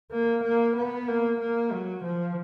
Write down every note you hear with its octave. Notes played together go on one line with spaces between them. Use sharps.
A#3
A#3
B3
A#3
A#3
F#3
F3